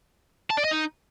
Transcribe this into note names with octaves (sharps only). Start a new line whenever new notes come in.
A5
D5
D#5
D#4